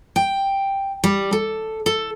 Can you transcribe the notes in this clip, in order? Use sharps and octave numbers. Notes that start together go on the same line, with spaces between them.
G5
G3
A4
A4